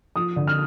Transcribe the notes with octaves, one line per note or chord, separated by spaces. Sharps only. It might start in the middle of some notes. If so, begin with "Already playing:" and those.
F3 D#6
D3
F6